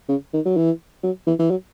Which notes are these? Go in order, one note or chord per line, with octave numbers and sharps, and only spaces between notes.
C#3
D#3
F#3
E3
F#3
E3
E3
F#3